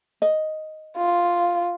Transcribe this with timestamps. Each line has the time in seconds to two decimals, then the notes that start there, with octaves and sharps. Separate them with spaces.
0.22 D#5
0.97 F4